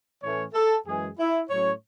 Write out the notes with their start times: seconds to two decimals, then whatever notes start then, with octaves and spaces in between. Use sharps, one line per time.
0.21 A2 E3 A3 C#4 C#5
0.53 A4
0.86 F#2 E3 G#3 G#4
1.18 E4
1.49 A2 F#3 C#4 C#5